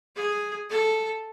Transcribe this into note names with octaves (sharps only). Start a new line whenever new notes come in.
G#4
A4